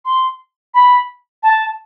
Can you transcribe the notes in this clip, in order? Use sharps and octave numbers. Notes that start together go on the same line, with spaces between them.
C6
B5
A5